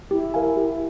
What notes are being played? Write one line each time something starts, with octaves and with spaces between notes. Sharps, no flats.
E4 G4
A#4 F5 G#5
G4